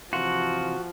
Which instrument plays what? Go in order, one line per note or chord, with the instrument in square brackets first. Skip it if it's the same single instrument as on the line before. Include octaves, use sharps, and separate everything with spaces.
[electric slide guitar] C3 E3 F4 [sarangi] F3 [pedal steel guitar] F#4